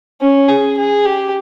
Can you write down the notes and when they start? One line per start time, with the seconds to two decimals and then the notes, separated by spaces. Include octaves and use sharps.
0.21 C#4
0.49 G#4
0.77 G#4
1.05 G4